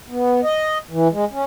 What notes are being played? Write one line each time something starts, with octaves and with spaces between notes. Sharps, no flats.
B3
D#5
E3
G#3
C#4